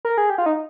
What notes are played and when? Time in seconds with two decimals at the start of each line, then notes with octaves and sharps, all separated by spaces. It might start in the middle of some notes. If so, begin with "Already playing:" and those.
0.05 A#4
0.18 G#4
0.30 G4
0.38 F4
0.46 D#4